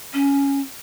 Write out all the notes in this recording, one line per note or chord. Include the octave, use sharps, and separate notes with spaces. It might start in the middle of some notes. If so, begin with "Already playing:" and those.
C#4